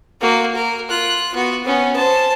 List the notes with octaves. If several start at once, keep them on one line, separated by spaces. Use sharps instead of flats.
A#3 F#4
A#4
F4 F#6
B3 F#4
B3 C#4
C5 A5